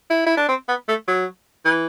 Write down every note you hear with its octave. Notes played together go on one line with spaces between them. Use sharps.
E4
E4
D4
C4
B3
A3
F#3
E3